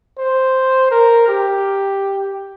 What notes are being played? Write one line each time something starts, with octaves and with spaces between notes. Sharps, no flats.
C5
A#4
G4